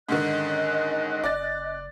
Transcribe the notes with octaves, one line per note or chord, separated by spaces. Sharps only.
G#2 D3 D#3 C#4 D#5 F#6
F#1 D5 A6